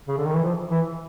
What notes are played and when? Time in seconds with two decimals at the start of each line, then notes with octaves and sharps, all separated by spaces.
0.08 C#3
0.17 D3
0.26 D#3
0.34 E3
0.43 F3
0.71 E3